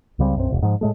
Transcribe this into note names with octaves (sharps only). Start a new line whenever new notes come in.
C#2 C#3 G3 C4
B1 F#2 C4
E1 C2
G#2 F3
A2 G#3 A3